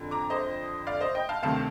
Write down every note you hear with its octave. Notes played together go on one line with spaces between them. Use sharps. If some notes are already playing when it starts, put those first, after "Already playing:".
Already playing: F2 D3
A#5 D6
C5 D#5
D5 F5
C5 D#5
D#5 G5
F5 A5
D2 C3 D#3 F5 A5